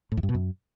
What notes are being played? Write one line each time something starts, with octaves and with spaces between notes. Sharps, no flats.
A2
E2
G2
B2
F#2